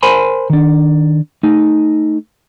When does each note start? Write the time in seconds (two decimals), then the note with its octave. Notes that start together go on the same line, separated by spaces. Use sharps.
0.03 A#4 C5 G#5 B5 C6
0.50 D#3 D4
1.43 A3 D#4